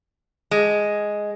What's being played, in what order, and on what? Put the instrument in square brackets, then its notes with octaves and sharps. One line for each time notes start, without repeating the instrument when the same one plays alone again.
[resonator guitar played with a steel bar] G#3